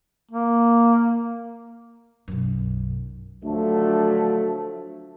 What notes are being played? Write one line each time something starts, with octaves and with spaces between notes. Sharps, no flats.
A#3
B1 F#2
D3 F3 F#3 A3